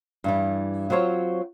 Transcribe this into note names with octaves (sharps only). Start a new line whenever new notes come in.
G2 E3 G3
F#3 C4 F4 C5 C#5